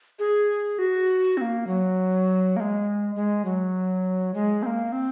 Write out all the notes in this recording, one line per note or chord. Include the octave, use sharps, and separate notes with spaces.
G#4
F#4
C4
A#3
F#3
A#3
G#3
G#3
F#3
G#3
C4
A#3
C4